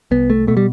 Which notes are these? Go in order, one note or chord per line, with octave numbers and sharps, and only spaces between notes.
C2 B3
A3
B2 A3
G3